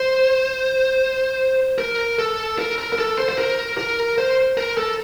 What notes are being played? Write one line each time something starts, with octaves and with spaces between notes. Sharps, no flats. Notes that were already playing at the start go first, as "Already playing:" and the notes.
Already playing: C5
A#4
A4
A#4
A#4
A#4
A4
C5
C5
A#4
A#4
C5
A#4
A4